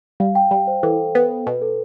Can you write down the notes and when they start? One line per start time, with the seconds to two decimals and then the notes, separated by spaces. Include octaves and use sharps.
0.20 G3 F5
0.35 G5
0.51 G3 G5
0.67 C5
0.83 E3 A4
1.15 B3
1.46 B2 B4
1.62 A4